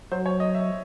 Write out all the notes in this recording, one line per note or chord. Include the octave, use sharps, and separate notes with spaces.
F#3 C5
C#5
D#5
E5